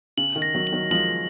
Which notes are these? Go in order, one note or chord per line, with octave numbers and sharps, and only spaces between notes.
C#3 F#7
D#3
A#6
D#3 F#3
F#7
D#3 F#3
F3 G#3 F#7